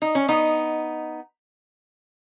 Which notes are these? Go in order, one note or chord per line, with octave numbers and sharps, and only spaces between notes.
D#4
C#4
B3 D#4